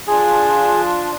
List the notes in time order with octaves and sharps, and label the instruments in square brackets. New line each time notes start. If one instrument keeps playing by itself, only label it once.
[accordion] F3 D4 F4 [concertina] G#4